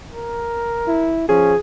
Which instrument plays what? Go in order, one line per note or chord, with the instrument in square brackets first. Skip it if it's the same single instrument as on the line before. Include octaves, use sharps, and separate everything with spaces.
[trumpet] A#4
[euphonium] E4
[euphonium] F3 [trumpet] C#4 [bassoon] G#4